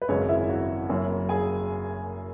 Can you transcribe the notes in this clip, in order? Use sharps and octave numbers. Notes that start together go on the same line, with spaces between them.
B4
G#1 F#2 C#3 G#3 C#4 C#5
E4 E5
F#4 F#5
F#1 F#2 F#3 C#4
G#4 G#5